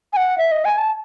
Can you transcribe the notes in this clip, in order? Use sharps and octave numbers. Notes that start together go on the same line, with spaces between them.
G#5
F#5
E5
D#5
G#5
A5